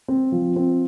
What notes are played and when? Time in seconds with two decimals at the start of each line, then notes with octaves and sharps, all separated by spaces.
0.08 C4
0.32 F3
0.56 C4